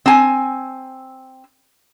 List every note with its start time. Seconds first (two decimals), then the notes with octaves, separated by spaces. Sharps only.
0.06 C4 G#5